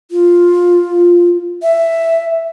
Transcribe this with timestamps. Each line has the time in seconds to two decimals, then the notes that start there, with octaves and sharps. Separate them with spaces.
0.11 F4
1.63 E5